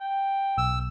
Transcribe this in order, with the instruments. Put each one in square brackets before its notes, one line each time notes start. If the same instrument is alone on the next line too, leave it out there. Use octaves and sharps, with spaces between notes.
[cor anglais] G5
[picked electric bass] B1 [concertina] E6